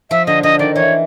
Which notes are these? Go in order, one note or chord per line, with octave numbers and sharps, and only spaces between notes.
F3 E5
D3 D#5
D3 D#5
D#3 D5
E3 C#5